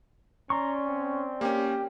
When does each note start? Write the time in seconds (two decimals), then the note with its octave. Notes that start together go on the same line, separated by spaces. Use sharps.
0.50 C#4 D5 A#5 C6 C#6
0.86 C4
1.41 A#3 C#4 G4